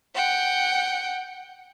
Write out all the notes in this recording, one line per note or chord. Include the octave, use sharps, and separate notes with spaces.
F#5 G5